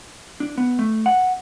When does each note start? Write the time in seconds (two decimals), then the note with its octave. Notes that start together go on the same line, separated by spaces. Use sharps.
0.40 D4
0.58 B3
0.79 A3
1.06 F#5